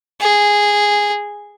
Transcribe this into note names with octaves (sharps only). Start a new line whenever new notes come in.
G#4